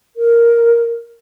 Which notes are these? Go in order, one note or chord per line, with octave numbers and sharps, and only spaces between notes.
A#4